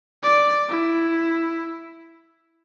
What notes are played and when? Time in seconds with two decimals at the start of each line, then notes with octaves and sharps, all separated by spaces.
0.23 D5
0.69 E4